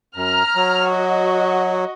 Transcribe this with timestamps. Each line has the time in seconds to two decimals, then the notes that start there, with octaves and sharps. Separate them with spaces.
0.16 F#2 A#5 F6
0.56 F#3
0.88 F#4 D#5